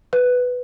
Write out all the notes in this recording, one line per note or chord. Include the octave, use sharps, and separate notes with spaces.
B4